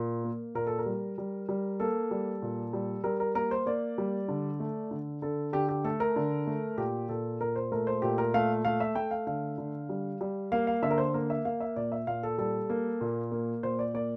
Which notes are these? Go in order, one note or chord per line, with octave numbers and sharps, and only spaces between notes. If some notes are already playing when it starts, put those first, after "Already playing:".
Already playing: A#2
A#3
A#2 A#4
A4
A#4
G3
G3
G3
A#3 A4
G3
A#2
G3
G3 A#4
A#4
A#3 A#4
C5
A#3 D5
G3
D3
A3
D3
D3 A4
D3 G4
G4
A3 A4
A#4
D3
A3
A#2 G4
A#2 A4
A#2 A#4
C5
A3 A#4
C5
A#2 G4
A#4
A3 F5
A3 F5
E5
A3 G5
F5
D3 F5
D3
G3
G3
A#3 F5
F5
D3 E5
A#4
C5
A#3 A#4
E5
A#3 F5
E5
A#2 D5
E5
A#2 F5
A4
G3 A4
A#3
A#2
A#3
A#2 C5
D5
A#3 D5